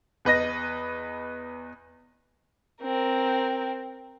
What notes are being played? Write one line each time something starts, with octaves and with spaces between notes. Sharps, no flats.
E2 B4 D#5 A#6
C4 A#4